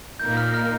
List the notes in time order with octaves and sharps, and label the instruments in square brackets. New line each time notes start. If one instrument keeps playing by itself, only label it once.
[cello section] A#2 A#3 D#4 A#4 [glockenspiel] G6
[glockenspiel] F6
F6